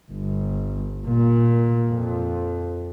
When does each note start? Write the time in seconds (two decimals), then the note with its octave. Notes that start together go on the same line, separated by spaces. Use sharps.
0.12 G1
1.07 A#2
1.88 F2